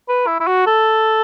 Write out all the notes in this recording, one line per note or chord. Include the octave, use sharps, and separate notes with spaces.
B4
E4
E4
F#4
A4